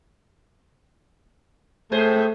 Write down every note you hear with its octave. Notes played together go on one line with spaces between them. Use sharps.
A2 A3 G#4 C5